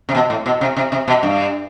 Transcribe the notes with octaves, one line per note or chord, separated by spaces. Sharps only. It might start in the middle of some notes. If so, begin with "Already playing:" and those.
C3
B2
A2
B2
C3
C3
C3
B2
G2